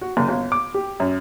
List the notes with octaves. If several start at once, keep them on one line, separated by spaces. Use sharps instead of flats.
F#4
F#1
G1
D6
G4
F#2